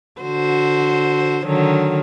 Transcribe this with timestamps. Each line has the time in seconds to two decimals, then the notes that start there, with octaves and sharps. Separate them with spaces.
0.21 D3 F#4 C5
1.45 D3 D#3 F#3